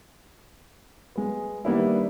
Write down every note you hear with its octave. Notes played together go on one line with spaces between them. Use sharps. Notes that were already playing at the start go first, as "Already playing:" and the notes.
G#3 B3
D#3 G3 A#3 B3 D4 E4